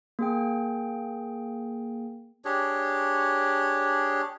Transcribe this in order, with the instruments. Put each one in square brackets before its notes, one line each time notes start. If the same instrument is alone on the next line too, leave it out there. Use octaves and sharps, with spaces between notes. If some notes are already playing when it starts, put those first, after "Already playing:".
[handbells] A#3 G#4 G5
[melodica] D4 G4 G#4 C#5